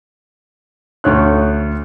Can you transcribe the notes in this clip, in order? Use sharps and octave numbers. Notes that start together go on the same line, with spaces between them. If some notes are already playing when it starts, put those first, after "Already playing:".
D2 C#5 F#6